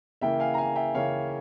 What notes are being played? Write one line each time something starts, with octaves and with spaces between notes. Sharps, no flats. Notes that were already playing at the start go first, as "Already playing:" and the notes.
C#3 E3 A#3 E5 G5
F5 G#5
A#5
F5 G#5
E5 G5
C#3 E3 A#3 C#5 F5